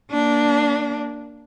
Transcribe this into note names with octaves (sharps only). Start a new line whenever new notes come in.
A#3 D4